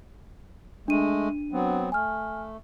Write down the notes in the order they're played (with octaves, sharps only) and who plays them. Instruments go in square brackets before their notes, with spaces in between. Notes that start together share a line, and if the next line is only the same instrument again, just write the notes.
[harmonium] G#3 A3 [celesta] D4 D#7
[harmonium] F#3 B3 C4
[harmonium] A3 [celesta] G#5 F6